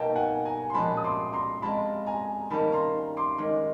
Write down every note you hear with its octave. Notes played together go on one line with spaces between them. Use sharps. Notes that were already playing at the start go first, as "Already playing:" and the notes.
Already playing: B2 G3 A#3 D#4 G5 A5 A#5
F#5 G#5
G#5 A#5
C6
A#2 F3 G#3 C#4 F#4 A5 B5
D#6
C6 D6
A#5 C6
G#3 C4 F4 A5 B5
G#5 A#5
D#3 G3 A#3 C#4 A5 B5
A#5 C6
C6 D6
D#3 G#3 C#4